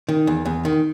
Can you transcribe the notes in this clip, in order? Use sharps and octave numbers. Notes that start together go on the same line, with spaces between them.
D#3
E2
E2
D#3